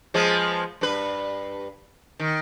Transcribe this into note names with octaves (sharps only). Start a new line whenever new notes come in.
F3 G#3 B3
G2 B4
D#3